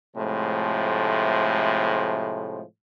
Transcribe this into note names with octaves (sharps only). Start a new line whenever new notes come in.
A2 C3 F3 G#3 A3